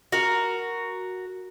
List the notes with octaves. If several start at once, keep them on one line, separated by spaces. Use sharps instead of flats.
F#4 A#4